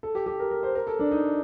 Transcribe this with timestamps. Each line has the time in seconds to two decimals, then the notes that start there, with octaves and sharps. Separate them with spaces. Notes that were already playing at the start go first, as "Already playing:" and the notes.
0.03 A4
0.15 G4
0.26 G4
0.39 A#4
0.51 A#4
0.63 C5
0.75 A#4
0.87 A4
0.99 D4
1.11 D#4